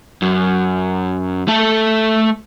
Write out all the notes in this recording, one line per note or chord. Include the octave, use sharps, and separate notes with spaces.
F#2
A3 A4